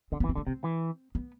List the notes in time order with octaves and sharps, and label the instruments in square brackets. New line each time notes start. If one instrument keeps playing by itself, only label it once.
[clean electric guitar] D3 [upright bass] C4
[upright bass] B3
[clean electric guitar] E3
[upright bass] C4
[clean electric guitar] D3 [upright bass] A3
[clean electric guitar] C3 [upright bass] C4
[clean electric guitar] E3
[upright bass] B3